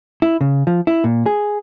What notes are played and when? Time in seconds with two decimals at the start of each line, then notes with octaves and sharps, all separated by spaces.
0.22 E4
0.41 C#3
0.67 F3
0.87 E4
1.04 A#2
1.26 G#4